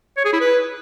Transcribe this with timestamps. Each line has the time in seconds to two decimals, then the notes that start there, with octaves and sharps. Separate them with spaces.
0.17 C#5
0.25 G#4
0.33 E4
0.41 B4